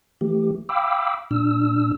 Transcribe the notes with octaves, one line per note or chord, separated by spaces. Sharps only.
E3 A3 G4
F5 G5 B5 D6 E6
A#2 D4 E6